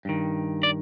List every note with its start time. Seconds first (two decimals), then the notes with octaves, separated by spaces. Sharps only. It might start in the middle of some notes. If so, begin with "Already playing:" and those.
0.05 G2 D#3
0.63 D5